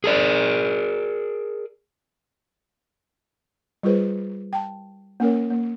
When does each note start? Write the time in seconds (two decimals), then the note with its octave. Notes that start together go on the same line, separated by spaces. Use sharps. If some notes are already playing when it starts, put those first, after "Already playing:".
0.04 G#4 A#4 D5
3.83 G3 F4 G#4 B4 C5
4.53 G5 A5
5.20 A#3 C#4 A#4 C#5
5.51 A#3